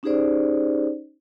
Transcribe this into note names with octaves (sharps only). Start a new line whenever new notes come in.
C#4 D#4 G4 G#4 C5 D5